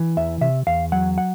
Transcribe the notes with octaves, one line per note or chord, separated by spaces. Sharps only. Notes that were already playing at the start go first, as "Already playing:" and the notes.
Already playing: E3
E2 E5
C3 E5
E2 F5
F#3 F#5
F#5